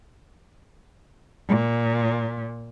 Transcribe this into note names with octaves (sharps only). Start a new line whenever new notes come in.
A#2